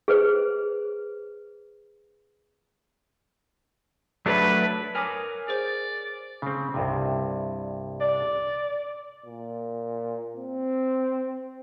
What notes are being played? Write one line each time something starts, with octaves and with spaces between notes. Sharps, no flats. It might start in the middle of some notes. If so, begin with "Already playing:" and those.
G#4 B4 C5
F#3 A3 D4 B4
A#4 C#5 G#5 D6 D#6 F6
G#4 C5 D5
C#3 C4
C2 G2 C3
D5
A#2
C4